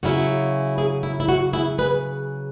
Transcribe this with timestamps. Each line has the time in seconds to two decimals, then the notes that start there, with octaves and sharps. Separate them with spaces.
0.03 C#3 F#3 C#4 E4 F#4
0.78 E4 G#4
1.03 E4
1.20 E4
1.29 F#4
1.53 E4 G#4
1.78 G#4 B4